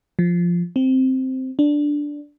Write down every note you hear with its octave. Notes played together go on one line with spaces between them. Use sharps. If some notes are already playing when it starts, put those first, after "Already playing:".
F3
C4
D4